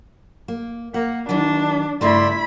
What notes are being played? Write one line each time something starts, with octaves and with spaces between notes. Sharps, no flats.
A#3
A#3 F#5
D#3 E3 F#3 D4
G2 C#3 A3 E4 D5 B5 C6